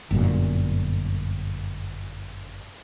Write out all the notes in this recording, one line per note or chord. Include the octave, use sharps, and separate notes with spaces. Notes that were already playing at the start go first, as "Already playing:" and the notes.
G1 F#2 A#2